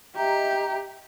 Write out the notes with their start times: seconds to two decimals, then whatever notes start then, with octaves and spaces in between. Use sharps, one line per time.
0.16 G4 D#5 E5 A#5